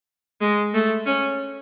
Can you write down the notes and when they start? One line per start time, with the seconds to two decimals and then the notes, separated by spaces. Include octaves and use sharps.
0.41 G#3
0.74 A3
1.06 C#4